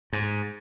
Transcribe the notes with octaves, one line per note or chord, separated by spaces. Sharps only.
G#2